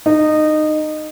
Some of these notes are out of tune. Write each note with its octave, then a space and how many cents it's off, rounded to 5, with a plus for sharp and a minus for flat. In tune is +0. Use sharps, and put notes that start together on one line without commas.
D#4 -20